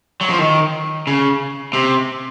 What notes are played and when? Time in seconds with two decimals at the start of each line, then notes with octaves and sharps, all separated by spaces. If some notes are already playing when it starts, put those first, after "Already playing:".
0.21 F#3
0.29 F3
0.39 D#3
1.07 C#3
1.73 C3